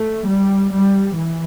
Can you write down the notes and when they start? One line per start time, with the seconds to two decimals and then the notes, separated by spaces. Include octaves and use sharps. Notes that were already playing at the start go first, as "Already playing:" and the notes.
Already playing: A3
0.28 G3
0.72 G3
1.15 E3